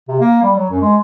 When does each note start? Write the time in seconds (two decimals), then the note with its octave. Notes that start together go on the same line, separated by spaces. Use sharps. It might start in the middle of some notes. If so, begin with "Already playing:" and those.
0.09 C3
0.20 A#3
0.43 G3
0.56 F#3
0.70 F#2
0.82 G#3